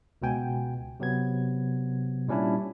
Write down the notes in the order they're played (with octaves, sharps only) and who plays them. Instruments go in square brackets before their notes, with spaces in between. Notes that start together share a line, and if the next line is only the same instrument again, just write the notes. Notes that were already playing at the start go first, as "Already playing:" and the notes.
[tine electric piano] C#2 B2 B3 G5 G#5
C3 F#3 B3 G#6
A#2 G3 C#4 D4 E4